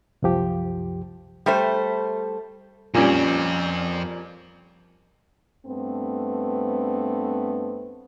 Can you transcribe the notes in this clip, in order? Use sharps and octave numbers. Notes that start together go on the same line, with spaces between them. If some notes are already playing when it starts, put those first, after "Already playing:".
C2 F#2 F3 G4
G3 A3 C5
F2 A#2 G3 C4 C#4
G2 A3 B3 C4